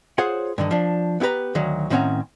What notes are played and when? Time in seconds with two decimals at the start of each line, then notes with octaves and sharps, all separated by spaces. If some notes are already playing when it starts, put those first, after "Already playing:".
0.18 F4 G#4 C5 C#5 F#5
0.58 G2 D3 D#3
0.71 F3 D4
1.20 B3 E4 G4 B4 A#5
1.55 D2 D#3 F#3
1.90 A2 D#3 C4 C#4 F#5 A#5